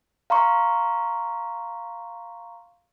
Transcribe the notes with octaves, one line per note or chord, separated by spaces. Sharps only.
F5 A#5 C6 C#6